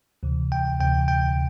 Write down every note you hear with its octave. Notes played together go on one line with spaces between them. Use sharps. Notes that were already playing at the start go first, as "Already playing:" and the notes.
D2 C3 E3
G5
D2 C3 E3 G5
G5